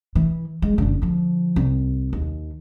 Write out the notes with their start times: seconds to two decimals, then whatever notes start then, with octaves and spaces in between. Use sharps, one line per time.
0.15 E3
0.62 G#3
0.78 F#1 D3
1.02 D3 F3
1.56 C2
2.13 D#2